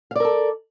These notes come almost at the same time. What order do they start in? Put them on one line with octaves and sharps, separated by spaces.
F5 D5 A#4 A4